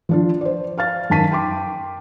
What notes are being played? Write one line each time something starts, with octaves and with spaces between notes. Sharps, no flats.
F3 D4 F4
C5 D5
F5 F6 A6
F#2 D#3 A5 B6 D#7
G5 C6 D6